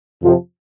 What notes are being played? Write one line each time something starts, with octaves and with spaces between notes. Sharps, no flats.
F2 C3 F3